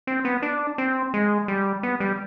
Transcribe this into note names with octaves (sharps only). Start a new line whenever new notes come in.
C4
B3
D4
C4
G#3
G3
B3
G3